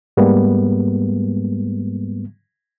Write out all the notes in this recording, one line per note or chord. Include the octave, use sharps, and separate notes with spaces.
G#2 G3 G#3 A#3 B3